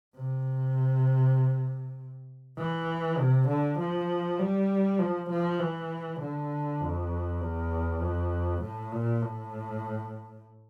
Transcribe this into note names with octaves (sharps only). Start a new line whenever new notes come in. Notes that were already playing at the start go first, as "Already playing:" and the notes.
C3
E3
C3
D3
F3
G3
F3
F3
E3
D3
F2
E2
F2
A2
A#2
A2